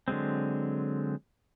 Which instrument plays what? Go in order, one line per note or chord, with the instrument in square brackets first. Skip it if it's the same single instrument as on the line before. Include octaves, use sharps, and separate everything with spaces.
[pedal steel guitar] D3 F#3 G#3 C4